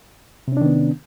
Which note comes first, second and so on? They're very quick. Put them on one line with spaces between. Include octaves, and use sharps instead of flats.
C3 C#4 D4 D#3 B3